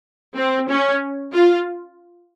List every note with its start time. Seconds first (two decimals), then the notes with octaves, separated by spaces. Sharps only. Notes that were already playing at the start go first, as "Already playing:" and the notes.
0.37 C4
0.70 C#4
1.33 F4